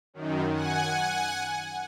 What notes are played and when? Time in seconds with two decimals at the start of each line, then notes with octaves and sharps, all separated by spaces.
0.14 F#2 D#3
0.52 F#5 G#5